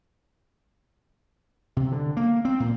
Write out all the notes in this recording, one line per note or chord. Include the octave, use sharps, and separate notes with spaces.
C3
D3
A#3
C4
A#2